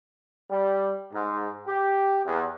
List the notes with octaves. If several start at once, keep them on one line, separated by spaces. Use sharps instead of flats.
G3
G#2
G4
E2